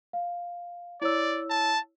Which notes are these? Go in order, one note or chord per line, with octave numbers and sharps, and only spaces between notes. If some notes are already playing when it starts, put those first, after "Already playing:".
F5
E4 C#5 D5 E6
A5